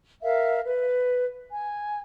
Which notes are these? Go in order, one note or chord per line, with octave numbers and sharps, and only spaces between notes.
A#4 E5 F5
B4
G#5